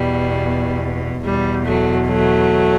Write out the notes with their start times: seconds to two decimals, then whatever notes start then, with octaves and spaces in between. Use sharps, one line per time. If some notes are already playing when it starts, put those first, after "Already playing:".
Already playing: E2 B2 G3
1.24 E2 B2 G3
1.65 F#3 A3
2.07 F#3 A3